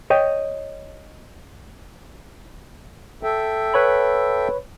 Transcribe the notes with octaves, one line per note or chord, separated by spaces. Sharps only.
C#5 D#5 G5
A4 E5 G5
B4 C#5 B5